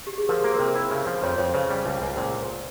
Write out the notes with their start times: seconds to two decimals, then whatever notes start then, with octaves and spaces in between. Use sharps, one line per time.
0.07 G4
0.18 G#4
0.29 F3 A#4
0.44 A#3
0.54 A#4
0.60 C3 C5
0.75 E4
0.91 C#3
1.07 F3
1.23 F2 C#5
1.38 F2 C5
1.54 C#3 C5
1.71 G3
1.86 C#2
2.02 C#2
2.17 A#2 C5